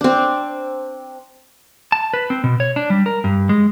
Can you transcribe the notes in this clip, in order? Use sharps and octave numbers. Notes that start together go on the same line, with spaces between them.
C4 D4
A5
B4
C4
B2
C#5
D4
G3
A#4
G2
G#3